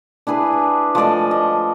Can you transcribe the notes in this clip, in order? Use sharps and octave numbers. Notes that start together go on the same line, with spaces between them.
D4 E4 G#4 B4
F3 A3 D5 D#5
D#5